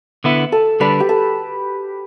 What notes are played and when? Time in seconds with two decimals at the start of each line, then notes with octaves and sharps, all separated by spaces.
0.24 D3 B3 E4
0.52 A4
0.80 D3 G3 D4 B4
1.00 G4
1.09 A4